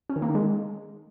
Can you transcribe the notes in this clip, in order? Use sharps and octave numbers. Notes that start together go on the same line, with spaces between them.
C#4
D#3
A#3
D#3
G#3